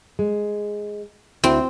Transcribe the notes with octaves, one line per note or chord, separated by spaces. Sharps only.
G#3
D2 C4 E4 F#4